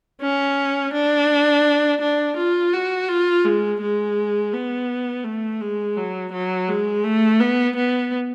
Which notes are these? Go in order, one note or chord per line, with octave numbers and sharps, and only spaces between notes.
C#4
D4
D4
F4
F#4
F4
G#3
G#3
B3
A3
G#3
F#3
F#3
G#3
A3
B3
B3